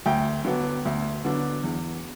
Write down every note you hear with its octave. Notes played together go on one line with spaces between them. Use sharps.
D2 G5
D3 F#3 B3 D4
D2
D3 F#3 B3 D4
E2